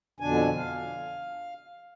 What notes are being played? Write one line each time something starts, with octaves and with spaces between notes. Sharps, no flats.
F2 B2 D3 D4 G#5
F5